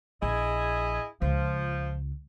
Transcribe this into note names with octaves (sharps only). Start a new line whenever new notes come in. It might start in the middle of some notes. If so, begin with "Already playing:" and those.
A#1 E4 G#4 D#5
C#2 F3